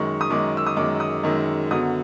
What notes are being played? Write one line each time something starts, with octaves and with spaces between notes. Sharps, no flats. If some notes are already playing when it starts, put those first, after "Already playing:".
Already playing: F#2 D#3 G#3 C#6
D#6
F#2 D#3 G#3 D6
E6
D#6
F#2 D#3 G#3 D6
D#6
F#2 D#3 G#3
F#2 D3 F#3 B3 D#6